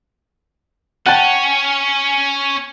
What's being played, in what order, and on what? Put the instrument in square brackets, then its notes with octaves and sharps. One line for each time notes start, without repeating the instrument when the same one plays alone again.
[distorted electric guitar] C#4 [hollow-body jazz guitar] F#5 G5 A5